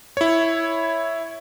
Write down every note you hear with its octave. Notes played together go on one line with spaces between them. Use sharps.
E4 C#5